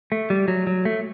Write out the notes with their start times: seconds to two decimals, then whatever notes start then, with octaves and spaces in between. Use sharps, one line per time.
0.12 A3
0.30 G3
0.48 F#3
0.67 F#3
0.85 A3